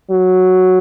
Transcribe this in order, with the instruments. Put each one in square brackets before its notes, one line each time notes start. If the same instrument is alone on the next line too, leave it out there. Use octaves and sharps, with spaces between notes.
[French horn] F#3